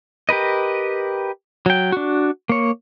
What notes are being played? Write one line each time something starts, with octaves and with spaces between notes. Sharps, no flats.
G4 A#4 B4 D#5
F#3 G5
D4 F#4
A#3 C#5